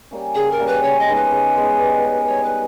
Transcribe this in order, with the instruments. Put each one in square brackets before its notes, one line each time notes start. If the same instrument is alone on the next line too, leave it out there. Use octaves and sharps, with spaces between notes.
[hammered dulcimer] G3 A#3 C#4
[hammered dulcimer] C#3 [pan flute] G#4
[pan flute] A#4
[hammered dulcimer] G3 A#3 C#4
[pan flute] B4
[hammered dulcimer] C#3 [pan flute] C#5
[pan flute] D#5
[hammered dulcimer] G#3 B3 D#4
[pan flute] B4
[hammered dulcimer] C#3
G#3 B3 D#4
G3
C#4 G4
[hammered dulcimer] G3 [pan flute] C#5
[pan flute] B4
[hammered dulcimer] G4